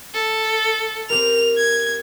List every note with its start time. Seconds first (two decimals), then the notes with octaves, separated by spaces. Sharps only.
0.15 A4
1.10 C4 G4 A#4 F7
1.58 G#6